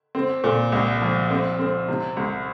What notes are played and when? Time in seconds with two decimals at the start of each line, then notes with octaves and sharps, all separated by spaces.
0.15 C4
0.44 A#2
0.72 C2
1.01 F3
1.31 C4
1.59 C4
1.88 C3
2.17 C2